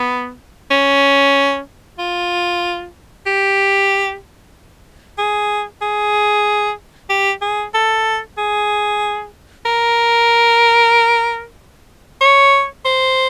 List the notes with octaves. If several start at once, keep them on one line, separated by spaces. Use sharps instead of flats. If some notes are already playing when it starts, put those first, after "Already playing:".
Already playing: B3
C#4
F4
G4
G#4
G#4
G4
G#4
A4
G#4
A#4
C#5
C5